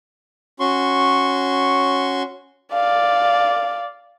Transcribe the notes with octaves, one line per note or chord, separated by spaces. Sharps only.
C#4 F#4 C6 C#6
D5 F5